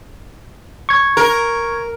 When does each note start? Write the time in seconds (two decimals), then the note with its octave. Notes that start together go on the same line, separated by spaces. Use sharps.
0.89 C#6 G#6
1.17 A#4